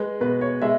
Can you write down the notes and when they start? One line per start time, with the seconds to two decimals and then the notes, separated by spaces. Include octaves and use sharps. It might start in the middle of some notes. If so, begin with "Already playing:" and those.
Already playing: G#3 B4
0.21 B2 B4
0.41 C#5
0.62 G#3 E5